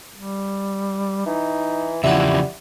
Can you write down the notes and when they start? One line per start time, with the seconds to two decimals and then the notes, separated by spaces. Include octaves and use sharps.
0.15 G3
1.26 E3 D#4
2.04 E2 C#3 F3 G3 E4 E5 F#5